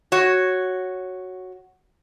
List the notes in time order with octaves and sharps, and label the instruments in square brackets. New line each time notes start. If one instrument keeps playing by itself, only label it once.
[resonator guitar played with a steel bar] F#4 C#5